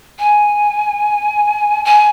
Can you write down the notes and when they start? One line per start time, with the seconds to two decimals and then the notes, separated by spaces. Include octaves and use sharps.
0.19 G#5
1.85 G#5